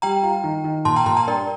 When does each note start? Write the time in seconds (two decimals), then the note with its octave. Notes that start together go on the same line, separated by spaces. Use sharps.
0.02 G3 G5 A#5
0.23 F4
0.44 D#3
0.64 D#3
0.85 A#2 A5 C6
0.96 G5 A#5
1.06 A#2 A5 C6
1.17 G5 A#5
1.27 G2 A#4 D5